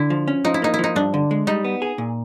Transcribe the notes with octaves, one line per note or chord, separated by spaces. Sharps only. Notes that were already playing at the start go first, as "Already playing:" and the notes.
Already playing: D3 E4
F3
C#4
F3 D#4
E4
A#3 D#4
E4
F3 D#4
G2 D4
D3
G#3
G3 D#4
B3
G#4
A#2